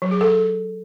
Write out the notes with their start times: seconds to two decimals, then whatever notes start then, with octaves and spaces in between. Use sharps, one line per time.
0.02 F#3
0.11 G#4
0.21 A4